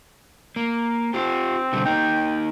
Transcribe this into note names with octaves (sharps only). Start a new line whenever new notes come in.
A#3
C4 F4 G4
B2 D3 G3
A#3 D#4 G5